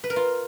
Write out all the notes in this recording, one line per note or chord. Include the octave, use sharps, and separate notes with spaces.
B4
A#4
F4